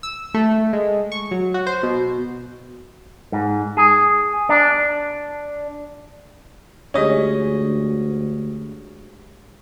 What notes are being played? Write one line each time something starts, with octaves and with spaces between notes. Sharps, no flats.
E6
A3
G#3
C#6
F#3
F#4
C5
B2
G#2
G#4
D4
D2 G#3 C#4 G4 G#4 D#5